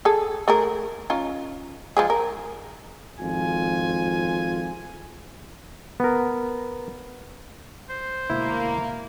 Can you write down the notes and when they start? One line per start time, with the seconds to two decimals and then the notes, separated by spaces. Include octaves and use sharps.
0.05 G#4 A4
0.48 A3 G#4 A#4
1.10 C#4 D#4 F4
1.97 F3 G#3 G#4
2.10 A#4
3.20 G#1 F2 F4 G#5
6.00 B3 A#4
7.89 C5
8.30 D2 B2 G#3 A#3 E4